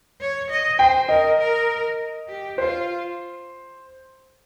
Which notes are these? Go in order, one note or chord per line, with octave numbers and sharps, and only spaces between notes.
C#5
D#5
C5 G5
A#4 D#5
A#4
G4
F4 C5